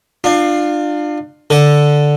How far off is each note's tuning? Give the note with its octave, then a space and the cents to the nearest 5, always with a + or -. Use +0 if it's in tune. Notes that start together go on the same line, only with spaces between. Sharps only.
D4 +35 F4 +10
D3 +0 A4 +0